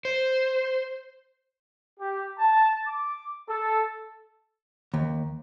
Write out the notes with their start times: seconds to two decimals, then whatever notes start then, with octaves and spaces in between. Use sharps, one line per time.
0.05 C5
2.00 G4
2.38 A5
2.86 D6
3.48 A4
4.94 D#2